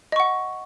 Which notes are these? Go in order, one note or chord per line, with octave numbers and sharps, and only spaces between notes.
D#5 F#5 C#6